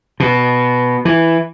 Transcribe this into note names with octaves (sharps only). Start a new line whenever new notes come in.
B2
E3